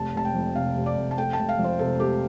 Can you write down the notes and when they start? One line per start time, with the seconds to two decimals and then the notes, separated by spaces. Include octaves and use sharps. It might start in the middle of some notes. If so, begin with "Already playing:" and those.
Already playing: F1 A5
0.14 F1 A5
0.25 G5
0.35 F2
0.55 C3 F5
0.76 F1
0.86 D5
0.97 F1
1.11 A5
1.18 A3 G5
1.33 A5
1.38 F1
1.49 F5
1.59 F2
1.64 C5
1.79 C3 A4
2.00 A3 G4